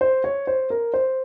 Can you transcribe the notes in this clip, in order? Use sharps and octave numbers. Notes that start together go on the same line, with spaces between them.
C5
C#5
C5
A#4
C5